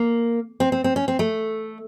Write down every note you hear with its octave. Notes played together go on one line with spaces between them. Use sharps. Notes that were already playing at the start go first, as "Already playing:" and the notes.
Already playing: A#3
C4
C4
C4
C#4
C4
A3